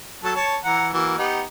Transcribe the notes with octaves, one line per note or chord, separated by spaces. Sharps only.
F#3 A4 A5
C#5 A5
E3 F#5 A#5
E3 A#3 F#4
B3 D#4 G4